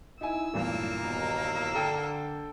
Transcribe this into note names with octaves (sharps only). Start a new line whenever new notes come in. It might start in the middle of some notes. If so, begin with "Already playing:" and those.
D#4 E4 G#5 E6
E2 G2 A#2 F#3 A3 A#3
D#2 B2 A#5 E6
D3 A4 G5